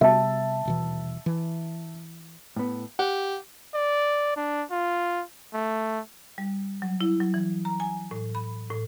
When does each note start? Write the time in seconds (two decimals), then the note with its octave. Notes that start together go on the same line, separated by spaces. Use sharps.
0.01 C3 G3 B3 E5 A5
0.65 D#1 B2 E3
1.26 E3
2.56 A2 B3
2.99 G4 F#5
3.74 D5
4.36 D4
4.71 F4
5.54 A3
6.38 G3
6.82 F#3
7.01 E4
7.20 F#3
7.34 E3
7.65 A#5
7.80 G#5
8.11 A2
8.35 B5
8.70 A2